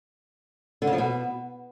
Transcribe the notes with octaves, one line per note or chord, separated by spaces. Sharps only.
D3
C#3
F3
B2